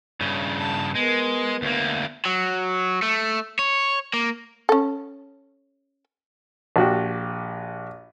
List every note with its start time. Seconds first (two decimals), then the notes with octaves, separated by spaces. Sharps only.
0.21 G2 C#3
0.59 A5
0.95 G#3 B3 A#4
1.62 D2 A#3
2.25 F#3
3.03 A3
3.59 C#5
4.14 A#3
4.69 C#4 A4
6.76 A#1 F#4 G4